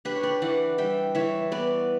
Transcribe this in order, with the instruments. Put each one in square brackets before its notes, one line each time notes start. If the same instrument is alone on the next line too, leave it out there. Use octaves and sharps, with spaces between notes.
[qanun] D4 G4 B4
C#5
B4 D5
E3 D5 F#5
G3 E5 G5
E3 C#5 E5
B3 B4 D5